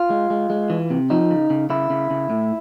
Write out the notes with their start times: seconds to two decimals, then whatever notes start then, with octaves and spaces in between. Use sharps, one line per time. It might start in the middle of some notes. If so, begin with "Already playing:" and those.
Already playing: F4
0.10 G#3
0.30 G#3
0.50 G#3
0.70 E3
0.90 C3
1.10 F3 D#4
1.30 C#3
1.50 C#3
1.70 C#3 E4
1.90 C#3
2.10 C#3
2.30 A2